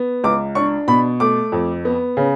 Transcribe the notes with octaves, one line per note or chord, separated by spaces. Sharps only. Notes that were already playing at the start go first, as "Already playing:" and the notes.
Already playing: B3
C#2 D6
D4 C#6
B2 B5
A3 D6
F2
B3
C#3